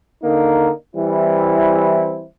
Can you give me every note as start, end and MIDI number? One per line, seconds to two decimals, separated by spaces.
0.23 0.69 50
0.23 0.69 58
0.23 0.69 63
0.95 2.25 52
0.95 2.25 55
0.95 2.25 60
0.95 2.25 64